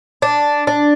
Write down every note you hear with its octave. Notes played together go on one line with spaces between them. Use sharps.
D4
D4